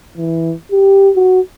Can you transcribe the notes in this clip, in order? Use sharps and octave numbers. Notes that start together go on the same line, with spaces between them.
E3
G4
F#4